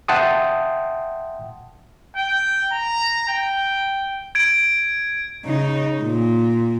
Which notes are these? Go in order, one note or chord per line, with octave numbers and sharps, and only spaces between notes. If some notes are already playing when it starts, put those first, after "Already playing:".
E5 F#5 G5 A5 C6 D#6
G5
A#5
G5
G#6 D7
C#3 D#4
A#2